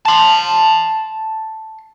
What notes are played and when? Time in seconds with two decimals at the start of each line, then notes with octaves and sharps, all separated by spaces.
0.05 A5 C6